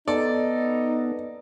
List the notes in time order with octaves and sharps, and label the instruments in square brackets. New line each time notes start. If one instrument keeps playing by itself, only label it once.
[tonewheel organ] B3 [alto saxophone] D#4 [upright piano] A4 [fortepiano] D5